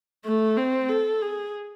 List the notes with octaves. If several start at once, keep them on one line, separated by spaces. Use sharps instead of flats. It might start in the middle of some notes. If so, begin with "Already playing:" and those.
A3
C4
A4
G#4